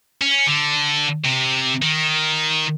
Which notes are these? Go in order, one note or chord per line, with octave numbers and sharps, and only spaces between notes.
C#4
D3
C3
D#3